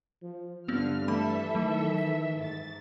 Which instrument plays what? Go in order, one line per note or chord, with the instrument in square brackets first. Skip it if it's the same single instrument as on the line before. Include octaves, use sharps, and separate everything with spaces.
[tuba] F3
[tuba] G2 [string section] D3 F6 [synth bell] B3 C4
[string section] E3 A4 E5 [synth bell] A3 B5
[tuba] D#3 [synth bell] F#3 A3
[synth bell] B6
[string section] G#2 A6